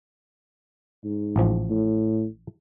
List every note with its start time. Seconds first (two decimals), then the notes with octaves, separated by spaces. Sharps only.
1.04 G#2
1.36 A1 F3
1.70 A2